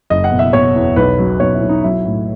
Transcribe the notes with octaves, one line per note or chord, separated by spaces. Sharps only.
F#1 D#5
F#5
B2
E5
B2 C#5
E2
B1 B4
F#3
B1 C#5
E4
B1
D#4
F#3 E4
A2